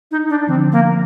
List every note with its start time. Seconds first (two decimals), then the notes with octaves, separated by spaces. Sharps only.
0.11 D#4
0.30 D4
0.47 D3 F3 C4
0.72 A#3